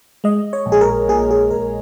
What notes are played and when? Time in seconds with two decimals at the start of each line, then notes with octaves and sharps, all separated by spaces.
0.24 G#3 D#5
0.53 C#5
0.66 A#1
0.72 G#4
0.81 A#4
1.08 A#2 G#4
1.31 G#4
1.51 A#1 A#4